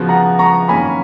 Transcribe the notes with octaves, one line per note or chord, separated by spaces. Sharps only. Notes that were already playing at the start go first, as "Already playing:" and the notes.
Already playing: C#3 F3 B3 F#4
F#5 A#5
A#5 C#6
F#2 D#3 A#3 C#4 G#5 B5